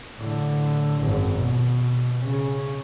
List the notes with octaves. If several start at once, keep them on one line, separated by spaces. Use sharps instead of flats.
A2 D3
G#1 F#2
B2
C#3 C#4